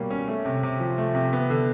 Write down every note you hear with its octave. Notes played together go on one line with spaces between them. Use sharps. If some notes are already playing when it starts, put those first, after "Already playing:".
Already playing: B2 G3 A#3 C#4
C#4
A3
C3
C3
F3
A3
C3
B3
D3